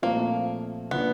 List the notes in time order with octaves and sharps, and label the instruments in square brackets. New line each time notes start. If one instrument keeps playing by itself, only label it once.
[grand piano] A#2 F3 A3 C4 [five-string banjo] A#3
[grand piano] C#3 F3 A#3 D4 [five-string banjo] B3